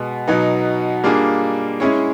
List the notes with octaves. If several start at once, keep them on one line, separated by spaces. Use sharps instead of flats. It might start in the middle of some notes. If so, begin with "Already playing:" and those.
Already playing: B2 G#3 B3
B2 F#3 B3 D#4
G3 A#3 D4 F4 G#4
G#3 C#4 E4 G#4 C#5